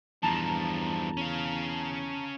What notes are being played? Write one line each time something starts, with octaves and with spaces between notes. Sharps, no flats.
E2 G2 F3 A5 A#5
C#4 F5